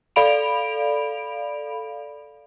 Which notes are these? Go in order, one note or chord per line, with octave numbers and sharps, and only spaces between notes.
A4 D5 F5 B5 D7 F7